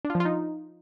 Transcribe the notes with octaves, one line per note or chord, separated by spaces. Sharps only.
D4
F4
F3
F4
D#4